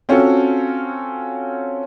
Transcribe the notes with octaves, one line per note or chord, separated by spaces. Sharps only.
C4 C#4 F4 F#4 A4